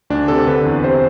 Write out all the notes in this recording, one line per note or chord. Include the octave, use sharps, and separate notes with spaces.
D2 D4
C3 A4
D3 B4
E2
C3 C5